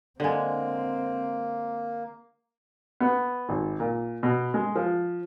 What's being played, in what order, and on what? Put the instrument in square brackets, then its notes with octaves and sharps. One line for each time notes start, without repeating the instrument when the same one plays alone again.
[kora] D3 G#3 [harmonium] A#3 [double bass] C4
[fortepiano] B3
G#1
A#2
B2
G#3
F3